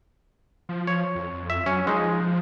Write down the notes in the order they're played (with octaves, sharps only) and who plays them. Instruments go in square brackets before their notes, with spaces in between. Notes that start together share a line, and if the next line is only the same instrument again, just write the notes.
[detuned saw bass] F3
[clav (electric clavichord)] C#5
[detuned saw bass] F2
[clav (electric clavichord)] E5
[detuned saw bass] F#3 [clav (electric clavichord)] C#4
[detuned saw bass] F3 [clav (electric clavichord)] G#3 D#4